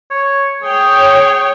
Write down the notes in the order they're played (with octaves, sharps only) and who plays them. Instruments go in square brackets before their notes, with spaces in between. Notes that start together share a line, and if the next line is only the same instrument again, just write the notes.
[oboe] C#5
[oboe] G#4 [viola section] C#5 G5